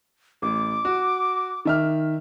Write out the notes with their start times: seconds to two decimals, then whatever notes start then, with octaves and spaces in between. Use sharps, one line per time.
0.42 A1 D6
0.85 F#4
1.65 D#3 E5 F6